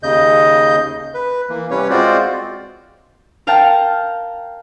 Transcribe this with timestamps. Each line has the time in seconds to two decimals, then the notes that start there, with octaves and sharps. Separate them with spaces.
0.03 D#2 C#3 D#5 G6
1.14 B4
1.50 E3 A#3
1.70 C3 G3 C#4 B4 C#5
1.90 G#3 C4 F4 F#4 C5 D5
3.47 A#4 F5 G5 A5 A#5